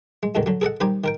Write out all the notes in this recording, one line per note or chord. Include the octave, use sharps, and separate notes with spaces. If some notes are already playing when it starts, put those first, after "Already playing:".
G#3
E2 G#2 B2 D3 D#3
D3 F#3
G#4 A4 D#5 F#5
D#3 G3 D#4 G4 C5 G#5
D#3 A#4 G5